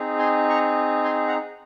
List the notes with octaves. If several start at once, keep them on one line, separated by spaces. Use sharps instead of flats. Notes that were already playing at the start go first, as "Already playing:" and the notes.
Already playing: C4 D#4 G#4
G#5 C6
A#5 C#6
G#5 C6
F#5 A#5